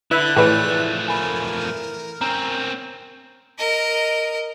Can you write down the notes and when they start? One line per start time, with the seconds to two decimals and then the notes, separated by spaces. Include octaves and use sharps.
0.11 D3 E4 B4 F#6 B6
0.36 A2 E3 F3 A3 G#4 B4 D5
1.08 A#4 G#5 B5
2.21 C4 C#4 A#5
3.58 A#4 D#5